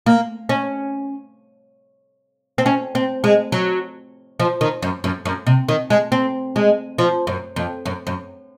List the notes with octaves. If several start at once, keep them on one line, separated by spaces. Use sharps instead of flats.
A#3
C#4
C4
C#4
C4
G#3
F#3
F3
D#3
F#2
F#2
F#2
C3
D#3
G#3
C4
G#3
F3
F#2
F2
F#2
F#2